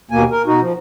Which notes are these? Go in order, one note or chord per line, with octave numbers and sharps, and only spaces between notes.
D#2 B2 A#3 G#5
A#4
B2 D#4 F#4
F3